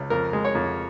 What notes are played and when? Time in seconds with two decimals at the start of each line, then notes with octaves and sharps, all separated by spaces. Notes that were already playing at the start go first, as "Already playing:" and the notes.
Already playing: C#2 C#3
0.10 F2 A#4
0.33 G#3
0.45 C#5
0.55 F2